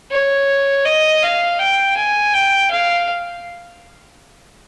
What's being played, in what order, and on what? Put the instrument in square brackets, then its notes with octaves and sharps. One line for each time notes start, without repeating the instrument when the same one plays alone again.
[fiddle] C#5
D#5
F5
G5
G#5
G5
F5